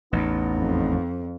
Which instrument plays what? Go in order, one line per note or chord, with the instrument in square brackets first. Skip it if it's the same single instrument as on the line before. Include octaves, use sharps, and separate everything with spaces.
[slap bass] A1 E2 [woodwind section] B3 D#4
[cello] F2